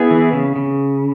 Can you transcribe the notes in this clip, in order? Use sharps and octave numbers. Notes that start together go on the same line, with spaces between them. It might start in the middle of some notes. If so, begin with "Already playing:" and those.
Already playing: B3 E4 G#4
E3
C#3
C#3